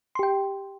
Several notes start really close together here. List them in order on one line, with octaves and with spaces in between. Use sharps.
C6 G4 G5